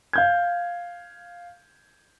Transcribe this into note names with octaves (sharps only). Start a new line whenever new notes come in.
F5 G6 G#6